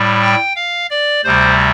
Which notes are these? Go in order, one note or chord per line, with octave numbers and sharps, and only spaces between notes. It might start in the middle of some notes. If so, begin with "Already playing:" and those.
Already playing: A2 G3
G5
F5
D5
D2 C3 G3 C5